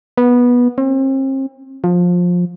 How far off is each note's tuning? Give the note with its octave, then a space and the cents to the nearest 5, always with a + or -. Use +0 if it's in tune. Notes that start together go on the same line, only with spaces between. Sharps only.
B3 -15
C4 +40
F3 +20